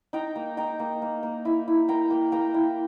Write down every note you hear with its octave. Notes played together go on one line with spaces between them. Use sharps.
D#4 G5 A#5
A#3
D#4 G5 A#5
A#3
A#3
A#3
E4
E4
A#3 G5 A#5
A#3
A#3 G5 A#5
E4